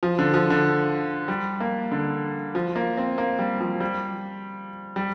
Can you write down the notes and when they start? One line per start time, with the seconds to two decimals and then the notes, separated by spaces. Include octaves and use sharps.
0.03 F3
0.19 D3
0.34 F3
0.50 D3
1.28 G3
1.60 A#3
1.92 D3
2.55 F3
2.76 A#3
2.97 C4
3.18 A#3
3.39 G3
3.60 F3
3.81 G3
4.96 G3